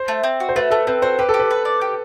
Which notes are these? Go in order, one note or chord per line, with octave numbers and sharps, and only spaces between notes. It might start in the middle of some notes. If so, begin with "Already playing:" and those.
Already playing: C5
A3
C4
F#4
C5
A3 B4
A3 A4
C4 B4
F#4 C5
G4 B4
A4
G4
B4
B4
D5
G4